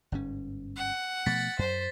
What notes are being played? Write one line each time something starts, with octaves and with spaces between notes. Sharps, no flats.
G1 G#2 C#4
F#5
B2 F3 A3 A6 B6
F#2 C5